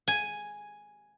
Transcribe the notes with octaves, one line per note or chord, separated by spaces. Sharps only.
G#5